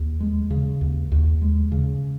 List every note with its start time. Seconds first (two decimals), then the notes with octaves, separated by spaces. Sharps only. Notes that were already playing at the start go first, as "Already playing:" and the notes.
Already playing: D#2
0.20 G#3
0.50 C#3
0.81 D#2
1.12 D#2
1.42 G#3
1.72 C#3